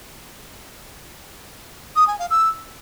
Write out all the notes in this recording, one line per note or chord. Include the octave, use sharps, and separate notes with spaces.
D#6
G#5
F5
E6